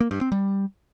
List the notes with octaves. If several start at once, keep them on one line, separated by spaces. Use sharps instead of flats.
A#3
G2
C4
G3